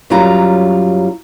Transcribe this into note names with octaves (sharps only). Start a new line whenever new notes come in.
F#2 F#3 G3 F4 A#5